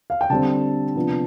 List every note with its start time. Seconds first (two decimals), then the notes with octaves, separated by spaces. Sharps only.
0.10 F5
0.21 G5
0.30 D3 G3 C4 A5
0.96 C3 F3 B3 D4